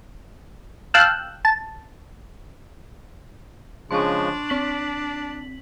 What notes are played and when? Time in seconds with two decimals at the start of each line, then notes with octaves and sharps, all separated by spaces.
0.94 F5 G5 A5 E6 F#6
1.45 A5
3.91 C#3 F3 G#3 D4 C6 C#6
4.49 C4 D6 B6 F#7